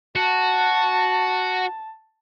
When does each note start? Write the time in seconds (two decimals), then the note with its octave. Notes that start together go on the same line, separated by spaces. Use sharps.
0.16 F#4 A5